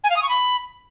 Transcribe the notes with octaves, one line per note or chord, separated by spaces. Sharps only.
G#5
F5
D#6
C#6
B5